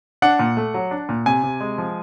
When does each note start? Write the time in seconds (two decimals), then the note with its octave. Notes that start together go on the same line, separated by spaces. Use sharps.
0.22 D4 F#5
0.39 A#2
0.57 A3
0.74 F#3
0.91 D4
1.09 A#2
1.26 C3 G#5
1.44 C3
1.61 G#3
1.78 F3